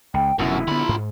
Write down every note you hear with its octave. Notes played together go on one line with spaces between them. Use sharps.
C#2 G5
F1 F#2 B2 D3 E4
D3 B3 F4 B5
G#2